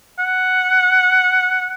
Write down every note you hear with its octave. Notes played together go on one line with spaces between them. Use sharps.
F#5